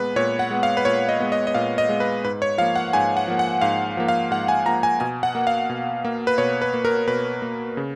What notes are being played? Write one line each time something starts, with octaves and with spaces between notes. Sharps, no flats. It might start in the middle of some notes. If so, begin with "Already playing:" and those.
Already playing: A#2 G#3 B3 B4
A#2 C#5
F#5
G#3 B3
F5
B4
A#2 C#5
D#5
G#3 B3
D#5
D#5
A#2 F5
D#5
G#3 B3
B4
G#2 B4
C#5
F3 A#3 F5
F#5
G#2 G#5
F#5
F3 A#3
F#5
G#2 F5
F3 A#3
F5
G#2 F#5
G#5
F3 A#3 A#5
G#5
B2 G#5
F#5
A#3
F5
B2
A#3
B4
B2 C#5
B4
A#3
A#4
B2 B4
A#3
C#3